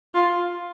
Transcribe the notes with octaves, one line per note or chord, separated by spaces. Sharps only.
F4